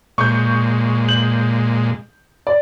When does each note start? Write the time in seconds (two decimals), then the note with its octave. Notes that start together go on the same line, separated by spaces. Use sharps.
0.18 A#2 G#3 C#6 G6
1.08 G6 F#7
2.47 D5